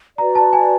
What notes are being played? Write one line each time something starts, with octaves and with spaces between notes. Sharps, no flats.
F#4 B4 D5 A#5
A5
G#5